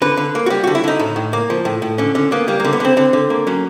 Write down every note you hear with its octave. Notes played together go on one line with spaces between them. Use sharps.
D3 B4
D3
A#3
F#4
G3 G4
D3 F#4
E4
D3 D#4
A2
A2
A#3
F3
A2
A2
D3 C#4
D3 C#4
A#3 B3
G3 A#3
D3 A#3
B3
D3 C4
D3 C4
D3
A#3
F#3 C#4